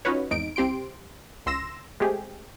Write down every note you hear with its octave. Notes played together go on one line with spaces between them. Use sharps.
C#4 D#4 F4 F#4 B4 C#5
G#1 E2 D#4 D7
C2 C4 G4 C6 D7
C#2 C6 E6 A#6 E7
G#3 A3 C4 G4 G#4